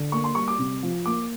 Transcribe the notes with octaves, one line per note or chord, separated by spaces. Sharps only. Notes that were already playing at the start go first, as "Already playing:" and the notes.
Already playing: D3
A#3 C#6
C6
G3 C#6
D6
C3
F3
A#3 D6